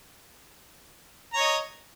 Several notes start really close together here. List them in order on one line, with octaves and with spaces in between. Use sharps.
A#5 C#5 D#5